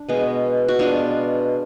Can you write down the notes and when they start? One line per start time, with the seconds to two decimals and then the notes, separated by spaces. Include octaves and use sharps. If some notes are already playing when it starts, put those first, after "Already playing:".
Already playing: D4
0.09 B2 G#3 B3
0.68 F#4
0.79 B2 G#3 B3 D4 F4